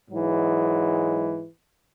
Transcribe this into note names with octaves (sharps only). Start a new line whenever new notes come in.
G#2 E3 F#3 G#3